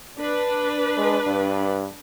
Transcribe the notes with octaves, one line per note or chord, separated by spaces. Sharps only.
D4 B4
G#3
G2